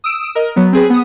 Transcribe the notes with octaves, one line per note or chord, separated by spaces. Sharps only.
D#6 E6 D7 E7
A#4 D#5
F#3 B3
C4 G#4 B4
B3 D#6